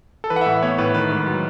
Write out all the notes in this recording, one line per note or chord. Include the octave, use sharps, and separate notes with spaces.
A4
E3 B4
F#5
E5
A2
F#5
B3 C#5
A2 B4
D#3 B4
G#2
F#3